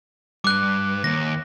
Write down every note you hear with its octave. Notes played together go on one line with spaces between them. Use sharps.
G2 D6 F#6
D#2 A#6